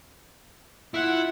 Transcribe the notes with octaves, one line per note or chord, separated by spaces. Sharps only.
E4 F4 F#5